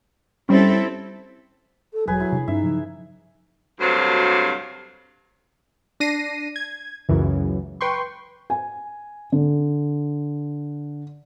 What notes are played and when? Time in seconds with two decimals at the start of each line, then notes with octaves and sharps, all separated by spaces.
0.49 G3 C4 C#4 E4 A4
1.93 A4
2.07 E1 F#3 G#4 B4 G#5
2.20 E4
2.32 C3 D4
2.48 G2 C#4 D#4 E5
2.63 C#3 F3 F#3
3.80 D2 G2 C3 F#3 C5 F5
6.00 D4 A#6 C7 D#7
6.56 G#6
7.09 C#2 F#2 C#3 E3
7.81 B4 G5 C6 C#6
8.50 G#5
9.32 D3